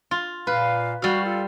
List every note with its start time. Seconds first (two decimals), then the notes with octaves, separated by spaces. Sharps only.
0.11 F4
0.47 A#2 B4 F5
1.02 G3 F#4 F5
1.24 F4 A4